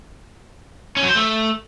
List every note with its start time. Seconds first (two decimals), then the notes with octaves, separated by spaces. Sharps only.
0.97 C#4
1.03 F#3
1.09 C5
1.15 A3